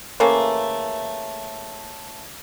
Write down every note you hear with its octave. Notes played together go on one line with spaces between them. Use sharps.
C#3 E3 A3 A#3